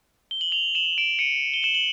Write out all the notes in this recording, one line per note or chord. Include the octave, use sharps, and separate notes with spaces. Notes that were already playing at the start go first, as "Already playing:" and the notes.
G7
F#7
F7 G7
E7 F#7
D7 E7
C#7 D#7
G7
E7 F#7
F#7